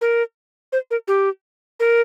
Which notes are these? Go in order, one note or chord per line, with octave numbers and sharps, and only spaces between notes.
A#4
C5
A#4
G4
A#4